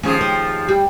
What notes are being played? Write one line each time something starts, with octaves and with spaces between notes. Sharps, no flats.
D#2 F3 C#4 G#4
C4
G3